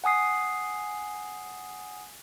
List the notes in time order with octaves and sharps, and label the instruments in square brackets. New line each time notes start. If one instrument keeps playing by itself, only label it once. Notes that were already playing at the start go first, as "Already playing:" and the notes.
[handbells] F#5 G#5 D#6 C7